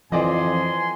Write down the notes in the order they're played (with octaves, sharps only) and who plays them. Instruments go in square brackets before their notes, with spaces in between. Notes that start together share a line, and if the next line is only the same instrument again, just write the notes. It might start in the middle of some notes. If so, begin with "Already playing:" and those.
[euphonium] F2 [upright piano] E3 D5 D#5 [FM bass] F3 [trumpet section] G#5 C6